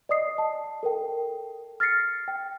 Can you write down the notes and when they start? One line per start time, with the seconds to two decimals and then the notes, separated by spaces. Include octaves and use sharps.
0.09 D5 D#5 D#6 C7
0.38 A5
0.83 A4 A#4 G5
1.80 F6 A6 A#6 C7 C#7
2.28 G5